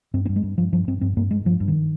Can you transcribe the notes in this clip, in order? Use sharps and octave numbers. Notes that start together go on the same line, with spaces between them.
G2 C4
C4
G2
G#3
G2
G2 F3
G2 F3
G2 C4
G2 C4
G2 A#3
G2 G#3
G2 F3
G2
D#3